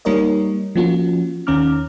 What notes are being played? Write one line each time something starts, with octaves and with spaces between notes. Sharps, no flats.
G3 A#3 D#4 A#4 C#5 D#5
F3 A#3 C#4 F4 F#4
D#2 D#3 C#4 A#5 D6 F6